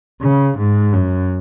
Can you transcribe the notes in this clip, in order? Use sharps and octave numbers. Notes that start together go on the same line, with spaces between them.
C#3
G#2
F#2